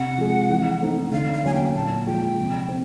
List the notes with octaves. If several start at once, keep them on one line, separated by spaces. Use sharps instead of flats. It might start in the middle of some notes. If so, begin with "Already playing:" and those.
Already playing: C3 F#5
F3 G#3
E3
A3 C4 D#4
D3 F5
F5
F#3 A#3 C#4 G#5
G5
A#2 A5
F3 G#3 G5
C3
C4